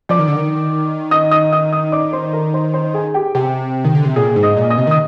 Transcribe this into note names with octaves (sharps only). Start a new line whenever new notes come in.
F3 D5 D6
D#3
D3
D#3
D#5 D#6
D#5 D#6
D#5 D#6
D#5 D#6
D5 D6
C5 C6
A#4 A#5
C5 C6
C5 C6
G#4 G#5
G4 G5
C3 G4 G5
D#3
D3
C3
A#2 G#4 G#5
G#2
D#5 D#6
A#2
D#5 D#6
C3
D#3 D#6